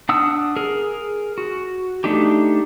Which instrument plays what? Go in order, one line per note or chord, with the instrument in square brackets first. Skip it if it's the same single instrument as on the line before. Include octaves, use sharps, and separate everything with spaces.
[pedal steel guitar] D4 F#5 D#6 E6
G#4 A#4
F#4
A3 D4 D#4 G4